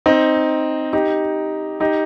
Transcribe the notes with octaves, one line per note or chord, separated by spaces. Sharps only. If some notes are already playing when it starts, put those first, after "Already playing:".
C4 D#4
D#4 G4
D#4 G4